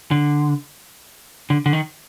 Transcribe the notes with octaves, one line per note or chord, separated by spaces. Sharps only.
D3
D3
D3
D#3